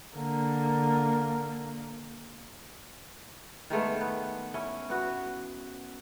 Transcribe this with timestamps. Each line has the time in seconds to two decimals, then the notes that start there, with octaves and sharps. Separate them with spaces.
0.15 D3 A#3
3.70 D#3 G#3 A3 B3
4.01 B3
4.54 C#4 E4
4.90 B3 F#4